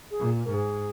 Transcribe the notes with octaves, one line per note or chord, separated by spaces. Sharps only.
G#4
A#2
G#2 A#4
G#4